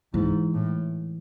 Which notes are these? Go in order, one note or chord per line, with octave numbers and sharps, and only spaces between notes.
G#2 E3
A2